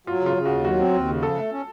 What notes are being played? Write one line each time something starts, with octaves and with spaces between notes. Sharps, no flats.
F#3 F4
C#3 F4
C#3
F#4
D#2
F#3 F#4
C4
D#2
C#3
F3 A4
A3
C#4